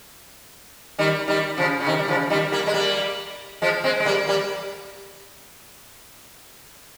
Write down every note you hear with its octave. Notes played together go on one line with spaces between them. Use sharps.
D#3 G3
D#3 G3
C#3 F3
C#3
C3 D#3
G3
C#3 F3
D#3 G3
G3 A#3
G#3
G3 A#3
F3 G#3
G#3 C4
G#3
G3 A#3
G3 A#3